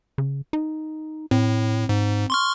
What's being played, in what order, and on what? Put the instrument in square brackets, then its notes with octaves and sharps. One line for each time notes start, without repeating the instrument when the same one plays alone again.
[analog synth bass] C#3
D#4
[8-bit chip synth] A2 [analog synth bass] C4
[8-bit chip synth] G#2
C6 C#6 F6